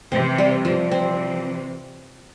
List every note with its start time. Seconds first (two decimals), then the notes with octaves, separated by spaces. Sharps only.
0.11 C3 E3 C4
0.38 G3
0.65 C3 E3 F3
0.91 C4